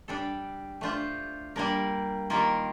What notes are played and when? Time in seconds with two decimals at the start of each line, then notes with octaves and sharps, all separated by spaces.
0.08 G3 D4 A4
0.81 A3 D4 F4 C5
1.56 G3 A#3 D4 F4 A#4
2.30 D#3 G3 A#3 F4 A#4